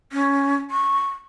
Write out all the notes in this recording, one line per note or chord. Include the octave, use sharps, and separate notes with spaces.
C#4
C#6